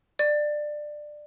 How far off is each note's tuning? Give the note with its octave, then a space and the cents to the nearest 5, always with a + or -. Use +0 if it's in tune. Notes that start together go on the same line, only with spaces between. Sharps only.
D5 +20